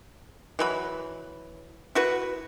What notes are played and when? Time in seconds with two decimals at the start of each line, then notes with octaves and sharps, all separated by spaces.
0.59 E3 F#3 B5
1.95 E4 F#4 B4